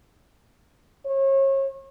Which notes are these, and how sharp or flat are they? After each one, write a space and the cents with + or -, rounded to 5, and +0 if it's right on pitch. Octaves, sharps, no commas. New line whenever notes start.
C#5 -35